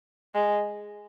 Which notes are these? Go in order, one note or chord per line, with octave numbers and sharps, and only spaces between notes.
G#3